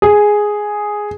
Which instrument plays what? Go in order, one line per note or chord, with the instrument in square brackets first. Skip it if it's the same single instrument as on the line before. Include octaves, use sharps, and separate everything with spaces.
[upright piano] G#4